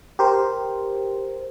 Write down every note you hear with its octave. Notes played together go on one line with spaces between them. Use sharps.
G4 A#4 C5